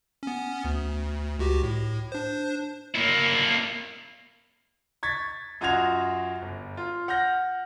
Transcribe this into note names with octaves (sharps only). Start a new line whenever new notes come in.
B3 C#4
D2
C#2 F#4 G4
A2
D4 C5
A#3 E4
C#6 G#6 A6 B6
F#2 F4 F#4 D#5 G#6 F7
G1
F4
F#5 F6 G6 A#6